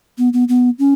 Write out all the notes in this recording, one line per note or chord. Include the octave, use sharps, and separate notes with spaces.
B3
B3
B3
C#4